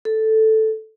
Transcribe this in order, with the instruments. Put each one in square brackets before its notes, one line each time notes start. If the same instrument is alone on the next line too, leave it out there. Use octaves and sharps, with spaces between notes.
[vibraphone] A4